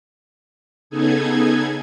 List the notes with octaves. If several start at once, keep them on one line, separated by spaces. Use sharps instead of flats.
C#3 B3 D#4 G#4 A4 G#6